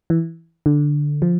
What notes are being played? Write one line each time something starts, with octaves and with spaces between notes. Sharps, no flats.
E3
D3
F3